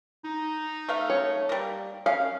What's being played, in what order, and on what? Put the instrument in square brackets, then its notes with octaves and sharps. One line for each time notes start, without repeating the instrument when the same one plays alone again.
[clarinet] D#4
[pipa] A3 F5
[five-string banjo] C#5
[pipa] G3 A#3
[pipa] C#4 [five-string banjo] F5